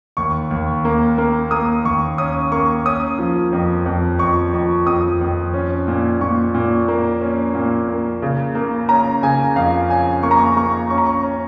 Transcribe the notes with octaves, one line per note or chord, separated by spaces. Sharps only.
D#2 C#6
D#2
A#3
A#3
A#3 D#6
D#2 C#6
C#4 D#6
A#3 C#6
C#4 D#6
F3
F2
F2
F2 C#6
F2
F2 D#6
F2
C#4
A#2
A#2 C#6
A#2
A#3
C#4
A#2
A#3
C#3
A#3
C#4 A#5
C#3 G#5
F2 F5
C#4 G#5
A#3 C#6
A#5
C#6
A#3 C#6
C#4 C#6
A#5
C#6
C#4